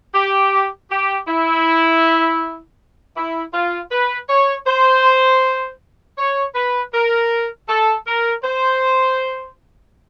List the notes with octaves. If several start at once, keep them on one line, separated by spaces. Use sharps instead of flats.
G4
G4
E4
E4
F4
B4
C#5
C5
C#5
B4
A#4
A4
A#4
C5